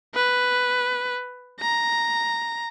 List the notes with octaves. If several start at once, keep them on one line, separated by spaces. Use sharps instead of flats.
B4
A#5